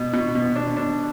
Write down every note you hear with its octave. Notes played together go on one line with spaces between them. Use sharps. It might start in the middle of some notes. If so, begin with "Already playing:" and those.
Already playing: B2
B2
B2
D4
D4